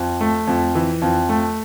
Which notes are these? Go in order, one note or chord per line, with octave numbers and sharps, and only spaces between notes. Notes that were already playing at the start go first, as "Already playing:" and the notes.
Already playing: F2
A3
F2
E3
F2
A3